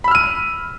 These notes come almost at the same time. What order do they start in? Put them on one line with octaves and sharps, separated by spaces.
B5 E6 F6 D#7